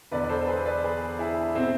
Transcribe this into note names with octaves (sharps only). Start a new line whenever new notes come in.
E1 E2 D3 B4 D5
D5
A4 C5
C5
G#4 B4
B4 D5
G#4 B4
E4 G#4
B2 G#3 C4 E4